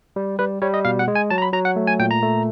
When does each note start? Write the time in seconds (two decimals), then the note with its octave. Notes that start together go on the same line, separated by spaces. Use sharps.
0.16 G3
0.39 G3 B4
0.62 G3 C#5
0.74 D#5
0.85 B2 F5
0.99 F#5
1.08 G#3
1.15 G#5
1.30 F#3 A5
1.38 A#5
1.42 B5
1.53 F#3 A#5
1.65 F#5
1.76 A3
1.87 G#5
1.99 A#2 G5
2.11 A#5
2.23 A3